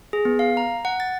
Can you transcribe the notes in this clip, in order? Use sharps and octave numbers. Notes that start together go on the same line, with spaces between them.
G#4
B3
F5
A#5
F#5
A6